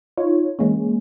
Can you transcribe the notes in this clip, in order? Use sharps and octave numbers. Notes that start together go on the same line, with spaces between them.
D#4 F4 C#5
E3 G#3 A#3 C#4